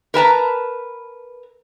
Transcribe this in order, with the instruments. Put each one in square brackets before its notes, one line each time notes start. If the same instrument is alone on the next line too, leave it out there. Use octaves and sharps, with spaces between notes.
[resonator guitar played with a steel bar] A#4 B4 A5 A#5